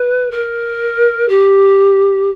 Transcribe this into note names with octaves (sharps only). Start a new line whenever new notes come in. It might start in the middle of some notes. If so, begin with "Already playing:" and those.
Already playing: B4
A#4
G4